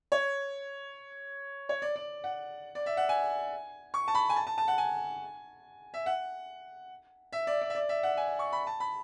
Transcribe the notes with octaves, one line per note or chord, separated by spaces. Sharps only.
C#5
C#5
D5
D5
F#5
D5
E5
F#5
G#5
C#6
A5
B5
G#5
A5
A5
A5
F#5
G#5
E5
F#5
E5
D5
D5
E5
D5
E5
F#5
G#5
C#6
B5
A5
B5